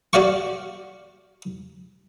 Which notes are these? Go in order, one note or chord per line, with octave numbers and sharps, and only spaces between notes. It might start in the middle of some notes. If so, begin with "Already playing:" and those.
F#4 D5 F5 C#6